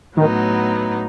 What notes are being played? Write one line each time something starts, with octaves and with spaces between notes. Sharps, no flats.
A2 D#3 F#3 B3 D#4